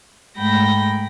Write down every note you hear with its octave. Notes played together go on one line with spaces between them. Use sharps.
G#2 G#3 A3 G5 B5 A#6